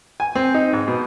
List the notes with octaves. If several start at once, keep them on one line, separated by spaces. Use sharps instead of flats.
G#5
C4
D#4
G#2
B2